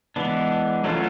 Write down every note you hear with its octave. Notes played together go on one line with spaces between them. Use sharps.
E3 G#3 B3 D4
F#3 A3 C#4 F4 A4